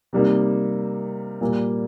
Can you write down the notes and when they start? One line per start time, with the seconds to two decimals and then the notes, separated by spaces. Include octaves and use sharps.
0.13 C3 G3 A#3 D#4
1.41 A#2 G3 A#3